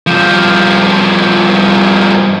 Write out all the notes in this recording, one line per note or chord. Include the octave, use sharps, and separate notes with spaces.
G2 F3